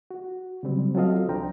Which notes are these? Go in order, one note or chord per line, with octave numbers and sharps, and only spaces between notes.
F#4
C#3 F#3 G3 C4
F#3 C4 F4 A4 D#5 F5
C2 F3 D4 C5 G5 A#5